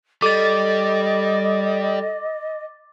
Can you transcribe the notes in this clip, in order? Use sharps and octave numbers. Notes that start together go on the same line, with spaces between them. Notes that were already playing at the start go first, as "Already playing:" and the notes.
G3 A4 D#5 D6 A6